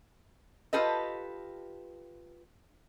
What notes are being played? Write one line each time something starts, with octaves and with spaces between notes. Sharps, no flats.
F4 G4 A4 B4 D#5